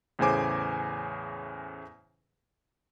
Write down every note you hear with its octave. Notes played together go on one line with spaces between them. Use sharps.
E2 A2 C#3 C5 G#5 D6